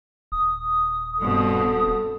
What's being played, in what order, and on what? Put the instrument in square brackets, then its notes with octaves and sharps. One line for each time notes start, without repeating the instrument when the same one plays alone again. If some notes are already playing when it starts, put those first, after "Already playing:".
[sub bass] D#1 [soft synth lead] D#6
[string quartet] G2 B2 C4 [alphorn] A4